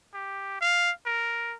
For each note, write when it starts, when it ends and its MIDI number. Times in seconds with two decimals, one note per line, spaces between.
0.14 0.60 67
0.61 0.91 77
1.06 1.56 70